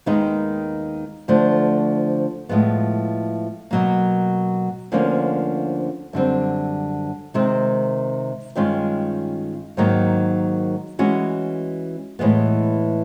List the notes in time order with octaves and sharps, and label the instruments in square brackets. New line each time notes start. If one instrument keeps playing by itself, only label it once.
[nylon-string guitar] D#2 D#3 G#3 B3 D#4
D2 D3 F3 A3 D4
A2 F3 G#3 B3
B2 F#3 A#3
D2 D3 F3 A#3 C#4
F#2 D3 G3 C4
C3 D#3 G#3 C4
G2 D#3 G#3 C#4 F4
G#2 D#3 F#3 A#3 D#4
E3 G#3 C#4 F#4
A2 E3 G#3 B3